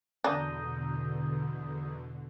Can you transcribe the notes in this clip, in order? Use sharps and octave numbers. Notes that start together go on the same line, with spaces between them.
E2 B2 D3 D4 A#5 D#6 G6